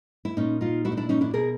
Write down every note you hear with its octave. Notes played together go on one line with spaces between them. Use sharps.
E4
A#2 C#4 D#4
D#4 F4
E4 F#4
D#4
D4 E4
C#4 D#4
D4 E4
B2 G#4 A#4